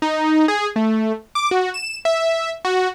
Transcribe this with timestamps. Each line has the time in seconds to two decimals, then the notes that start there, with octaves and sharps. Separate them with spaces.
0.02 D#4
0.48 G#4
0.76 A3
1.35 D6
1.51 F#4
1.74 E7
2.05 E5
2.65 F#4